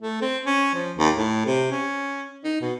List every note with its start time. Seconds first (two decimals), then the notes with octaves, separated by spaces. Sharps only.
0.01 A3
0.22 C4
0.46 C#4
0.74 F3
0.97 D#2
1.15 A2
1.46 C3
1.71 C#4
2.44 D#4
2.61 B2